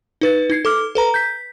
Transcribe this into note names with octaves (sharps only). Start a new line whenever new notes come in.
D#4 B4 A6
D#4 G#6 C7
A4 D6 F6
A4 B4 A#5
G6 B6